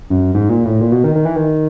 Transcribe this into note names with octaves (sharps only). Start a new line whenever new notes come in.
F#2
G#2
A#2
A2
A#2
B2
D#3
D#3
E3
D#3